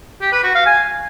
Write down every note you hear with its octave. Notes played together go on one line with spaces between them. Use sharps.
G4
B4
F#4
F5
G#5